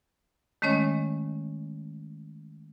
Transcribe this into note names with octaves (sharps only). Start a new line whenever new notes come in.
D#3 G#3 A3 C#4 C#5 D#5